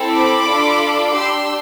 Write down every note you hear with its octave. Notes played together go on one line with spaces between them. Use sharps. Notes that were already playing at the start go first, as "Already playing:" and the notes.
Already playing: C4 E4 A4
B5 D6
D4 F4 A4
D4 G4 C6 E6